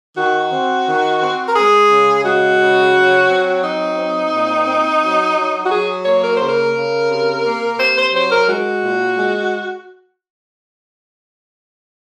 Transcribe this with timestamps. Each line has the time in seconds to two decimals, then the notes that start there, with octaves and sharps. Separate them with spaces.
0.17 D#3 F#4
0.52 C4
0.87 D#3
1.21 C4
1.47 A#4
1.55 G#3 G#4
1.90 C#3
2.24 G#3 F#4
2.60 C#3
2.94 F#3
3.29 C4
3.63 F#3 D#4
3.98 C4
4.33 A#2
4.67 C4
5.02 F#3
5.36 F#3
5.65 F#4
5.71 F#3 G#4
6.05 A#3 C#5
6.23 A#4
6.35 C5
6.40 C#3
6.47 A#4
6.75 C#3
7.09 C3
7.44 A#3
7.78 C3 C5
7.96 C5
8.13 F#3 C5
8.31 A#4
8.48 G#3 F#4
8.83 A#2
9.17 G#3